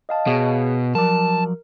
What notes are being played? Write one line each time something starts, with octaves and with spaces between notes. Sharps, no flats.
D#5 F5 A5
B2 G#4 C#5 F5
F3 F#3 A#4 D5 A5